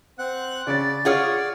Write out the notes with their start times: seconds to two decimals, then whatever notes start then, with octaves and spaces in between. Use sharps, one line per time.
0.19 C4 F#5 F#6
0.67 C#3 C#5 D5 A6
1.05 F4 G#4 C#5 F#5 F6